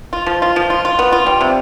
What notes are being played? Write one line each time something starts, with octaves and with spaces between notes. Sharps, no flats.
F4
F3
F4
F3
F4
F4
B3
F4
G3
C3